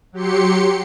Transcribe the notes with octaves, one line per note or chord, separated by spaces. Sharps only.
F#3 G4 C6 C#7